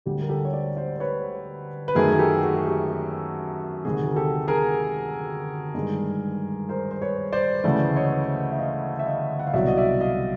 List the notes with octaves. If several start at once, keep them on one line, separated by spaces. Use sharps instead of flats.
D2 D3 G3 G4
A#4
G4 A4
C#5
C5 D5
C5 D5
C5
B4 C#5
B4
F#2 D#3 F#3 A3 G#4 A#4
A#4
G4 A4
F#4 G#4
G#4
G4
G4
D2 C3 D#3 F#4 G#4
A#4
G4 A4
G#4 A#4
G2 D#3 G#3
A#4 C5
C5
B4 C#5
C5 D5
D2 C#3 E3 A3 C5 D5
C#5 D#5
E5
D#5 F5
E5
D#5 F5
F#5
F5
C2 B2 F#3 D5 E5
D#5
D5 E5
D#5 F5